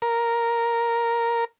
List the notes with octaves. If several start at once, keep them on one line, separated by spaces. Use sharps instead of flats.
A#4